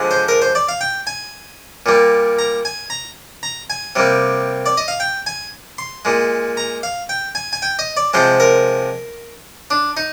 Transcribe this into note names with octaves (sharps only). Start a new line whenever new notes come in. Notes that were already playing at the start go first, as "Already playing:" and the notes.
Already playing: D3 F3 G#3
C5
A#4
C5
D5
F5
G5
G#5
A#2 G3 A#3
A#5
G#5
A#5
A#5
G#5
C3 G3 A#3
D5
D#5
F5
G5
G#5
C6
A#2 G#3
A#5
F5
G5
G#5
G#5
G5
D#5
D5
C3 F3 G#3 C5
A#4
D4
D#4